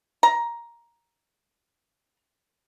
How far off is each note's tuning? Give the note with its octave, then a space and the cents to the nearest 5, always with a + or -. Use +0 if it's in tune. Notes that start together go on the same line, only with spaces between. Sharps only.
A#5 +10